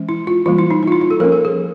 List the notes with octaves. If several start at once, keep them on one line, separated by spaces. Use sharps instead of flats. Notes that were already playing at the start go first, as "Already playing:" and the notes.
Already playing: E3 G#3 C#4
E4
F4
E3 G3 A#3 F4
E4
D#4
D#4
F4
E4
F4
A4
F3 A#3 C#4 A#4
A4
G#4